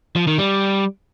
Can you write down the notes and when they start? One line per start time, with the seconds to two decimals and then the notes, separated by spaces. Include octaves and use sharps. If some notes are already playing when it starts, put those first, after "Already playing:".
0.16 F3
0.27 D#3
0.38 G3